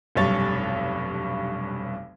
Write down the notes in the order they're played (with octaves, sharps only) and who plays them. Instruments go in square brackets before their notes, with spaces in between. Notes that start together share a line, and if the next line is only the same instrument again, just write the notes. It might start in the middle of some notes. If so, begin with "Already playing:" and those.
[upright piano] F1 B1 G2 C#5 A6